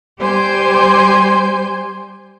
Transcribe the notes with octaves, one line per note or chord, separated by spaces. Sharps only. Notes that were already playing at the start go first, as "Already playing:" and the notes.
G3 G4 C5 G#5 C6 G6